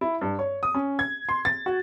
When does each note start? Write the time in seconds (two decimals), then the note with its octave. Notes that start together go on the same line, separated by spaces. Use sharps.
0.01 E4
0.21 G2
0.39 C#5
0.63 D#6
0.74 C#4
0.99 G#6
1.29 C6
1.45 A6
1.66 F#4